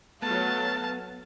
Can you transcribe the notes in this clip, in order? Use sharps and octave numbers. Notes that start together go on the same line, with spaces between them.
F#3 A3 B3 F5 A5